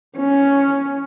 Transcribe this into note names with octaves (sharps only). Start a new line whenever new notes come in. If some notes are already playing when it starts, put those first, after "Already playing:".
C#4